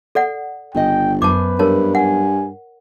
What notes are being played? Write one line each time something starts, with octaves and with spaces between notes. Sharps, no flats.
A4 D5 F#5
G1 C#3 D#5 G5
F#2 B3 B4 C5 A5 D6
G2 A#4 C#5 A5
F#5 G#5